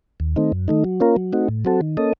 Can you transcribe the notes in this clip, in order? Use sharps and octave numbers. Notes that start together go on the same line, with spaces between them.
D#2
D#3 A3 C4 D#4
F#2
D#3 A3 D#4
F#3
A#3 C#4 F4 A#4
F#3
A3 C4 D#4 F#4
A2
F#3 C4 F#4 A4
D#3
A#3 C#4 A4 D#5